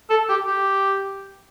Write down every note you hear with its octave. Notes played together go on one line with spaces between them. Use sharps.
A4
G4
G4